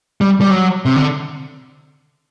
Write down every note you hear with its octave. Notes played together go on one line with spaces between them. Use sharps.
G3
G3
F#3
C3
D3